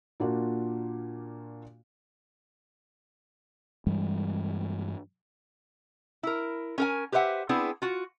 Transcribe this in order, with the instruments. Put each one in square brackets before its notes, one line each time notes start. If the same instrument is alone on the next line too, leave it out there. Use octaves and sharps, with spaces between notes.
[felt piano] A#2 A#3 D4 F4 F#4
[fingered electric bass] G2 E3 G3 G#3
[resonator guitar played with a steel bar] E4 A#4
C#4 A#4 G#5
G4 B4 C5 E5 F#5
B3 C4 D4 E4 G#4
F4 F#4